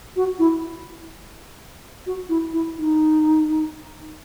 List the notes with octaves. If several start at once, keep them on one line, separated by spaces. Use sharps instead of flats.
F#4
E4
F#4
E4
E4
D#4